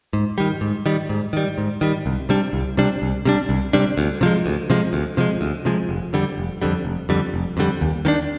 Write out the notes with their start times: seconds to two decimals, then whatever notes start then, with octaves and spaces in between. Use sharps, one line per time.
0.13 G#2
0.38 D#3 G3
0.61 G#2
0.86 D#3 G3
1.09 G#2
1.33 D#3 G3
1.58 G#2
1.81 D#3 G3
2.06 C2
2.29 C3 G3 D4
2.53 C2
2.77 C3 G3 D4
3.02 C2
3.25 C3 G3 D4
3.49 C2
3.73 C3 G3 D4
3.98 D2
4.21 C3 F3 G#3
4.46 D2
4.70 C3 F3 G#3
4.93 D2
5.17 C3 F3 G#3
5.41 D2
5.65 C3 F3 G#3
5.89 F1
6.13 F2 D3 G3
6.38 F1
6.62 F2 D3 G3
6.85 F1
7.09 F2 D3 G3
7.34 F1
7.57 F2 D3 G3
7.81 D#2
8.05 D#3 A#3 D4